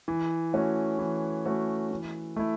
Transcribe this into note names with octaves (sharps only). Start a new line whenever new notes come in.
E3
A3 C#4 F#4
E3
A3 C#4 F#4
E3
A3 E4